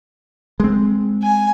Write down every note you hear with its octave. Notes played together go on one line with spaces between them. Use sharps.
G#3 C4
G#5